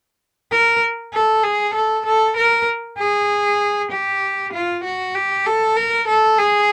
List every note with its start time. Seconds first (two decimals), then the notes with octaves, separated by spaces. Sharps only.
0.52 A#4
1.13 A4
1.44 G#4
1.74 A4
2.06 A4
2.37 A#4
2.98 G#4
3.91 G4
4.53 F4
4.84 F#4
5.15 G4
5.46 A4
5.77 A#4
6.08 A4
6.38 G#4